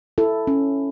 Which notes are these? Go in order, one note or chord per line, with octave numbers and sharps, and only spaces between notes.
E4 A4
C#4